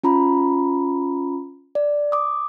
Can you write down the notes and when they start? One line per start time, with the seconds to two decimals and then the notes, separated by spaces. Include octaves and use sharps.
0.04 C#4 F4 A#5 B5
1.75 D5
2.12 D6 D#6